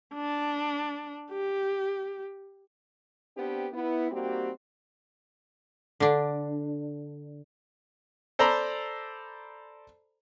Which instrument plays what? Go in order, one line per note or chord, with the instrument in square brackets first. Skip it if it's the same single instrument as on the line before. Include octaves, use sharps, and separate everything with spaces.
[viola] D4
G4
[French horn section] B3 C4 D4 G4 B4
B3 E4
G3 A#3 C4 D#4 F#4 G4
[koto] D3 D4
[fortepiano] A4 C5 D5 A#5 B5